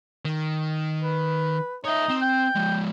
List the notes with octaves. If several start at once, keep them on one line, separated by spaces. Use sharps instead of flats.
D#3
B4
D#4 C#5 E5
C4
G5
F3 G#3